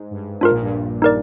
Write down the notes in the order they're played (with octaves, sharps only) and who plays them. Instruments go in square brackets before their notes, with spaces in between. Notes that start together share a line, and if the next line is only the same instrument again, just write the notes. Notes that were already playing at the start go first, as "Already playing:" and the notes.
Already playing: [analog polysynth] G#2
G2
[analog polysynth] G#2 [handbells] D4 F4 A#4
[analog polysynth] A#1 A#2
G2
[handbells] D#4 A#4 D5